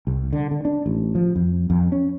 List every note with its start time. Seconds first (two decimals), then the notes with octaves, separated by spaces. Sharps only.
0.07 C2
0.33 D3
0.51 D3
0.65 D4
0.86 A1
1.15 F3
1.35 F2
1.70 F2
1.92 C#4